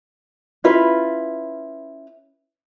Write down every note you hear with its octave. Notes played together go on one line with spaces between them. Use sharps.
C#4 E4 F4 B4